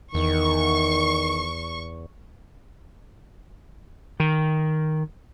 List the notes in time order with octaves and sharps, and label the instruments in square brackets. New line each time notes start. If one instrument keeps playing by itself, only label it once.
[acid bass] E2 [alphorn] D#3 [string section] C#6
[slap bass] D#3